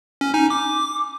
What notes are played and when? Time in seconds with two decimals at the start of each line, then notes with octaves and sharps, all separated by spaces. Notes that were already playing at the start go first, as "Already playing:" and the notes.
0.21 C#4
0.34 D#4 G#5
0.50 D6